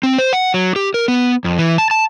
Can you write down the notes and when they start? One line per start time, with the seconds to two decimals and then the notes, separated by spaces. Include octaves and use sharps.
0.03 C4
0.18 C5
0.33 F#5
0.54 F#3
0.76 G4
0.94 A#4
1.08 B3
1.44 F2
1.58 E3
1.78 A5
1.91 A5